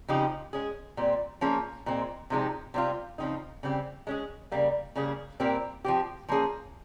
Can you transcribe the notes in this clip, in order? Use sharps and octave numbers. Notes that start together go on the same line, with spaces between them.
C#3 F3 C4 D#4 G4
G#3 C#4 G#4
A#2 G3 C4
F3 A#3 C#4 G#4
A#2 G#3 C4
C3 F3 G#3 D#4 G4
C3 G3 C4 F4
C#3 F3 C4 D#4
C#3 G3 C4 G4
G#3 C#4 G#4
C#3 G3 A#3
C#3 G3 A#3 C#4 G#4
A#2 G3 C4 G4 A#4
F3 C4 G4
F3 A#3 C#4 G#4